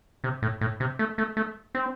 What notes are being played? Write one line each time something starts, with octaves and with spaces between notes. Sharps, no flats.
C3
A2
A2
C3
A3
A3
A3
C4